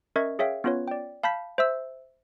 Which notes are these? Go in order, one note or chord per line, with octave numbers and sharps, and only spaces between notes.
C#4 A#4 D#5 E5 C#6 G#6
G#4 C#5 E5 F5 G5
B3 C#4 F4 B4 C#5
D5 G5
F5 A5 B5 G6 B6
C5 E5 E6